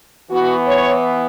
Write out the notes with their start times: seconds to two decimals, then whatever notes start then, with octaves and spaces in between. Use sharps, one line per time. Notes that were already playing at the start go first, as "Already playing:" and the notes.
0.30 E3 B3 F#4
0.67 C#5